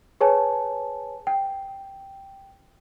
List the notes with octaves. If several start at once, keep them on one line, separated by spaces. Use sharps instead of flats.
G#4 B4 C#5 G#5 A5
G5